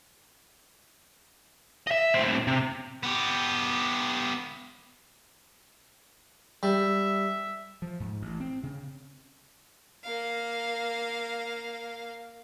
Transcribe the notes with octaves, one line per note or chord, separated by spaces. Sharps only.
D#5 E5
A2 C4
C3
B3 G4
G3 E5
F3
G#2
A1
C4
C#3
A#3 F5